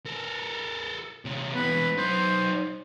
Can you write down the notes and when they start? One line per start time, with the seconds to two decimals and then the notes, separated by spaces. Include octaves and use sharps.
0.06 A4 A#4
1.25 C3 C#4
1.55 B2 E3 B4
1.98 F#3 D#4 C5